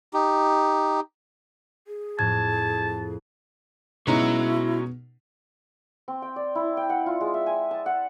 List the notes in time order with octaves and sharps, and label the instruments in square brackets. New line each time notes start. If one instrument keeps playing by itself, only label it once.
[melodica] D#4 G4
[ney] G#4
[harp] F2 A2 [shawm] A5 [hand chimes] G#6
[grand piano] B2 [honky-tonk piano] G#3 C#4 D#4 [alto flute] E4 [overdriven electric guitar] F#4 A#5
[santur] C4
G5
D5
E4
G5
F#5
F4
G#3
E5
G#5
A5
F#5